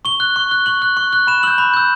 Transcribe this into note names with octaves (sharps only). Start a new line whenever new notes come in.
C#6 G7
F#6
C#6
F#6
C#6 F#7
F#6
C#6
F#6
B5 E7
E6 G6 F#7
B5
E6 G6